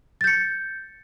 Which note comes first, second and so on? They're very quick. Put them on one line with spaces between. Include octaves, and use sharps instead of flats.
A6 G6 C#7